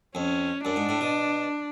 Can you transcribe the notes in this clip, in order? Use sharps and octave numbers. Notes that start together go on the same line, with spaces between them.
F2 C#4
F#2 D4
G#2
A2
B2